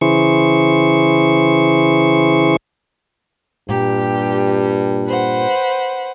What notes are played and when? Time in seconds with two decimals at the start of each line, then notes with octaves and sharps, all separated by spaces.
0.01 C#3 E3 E4 G#4 C5 C#6
3.69 G2 A#2 G4
5.06 B4 C5 F#5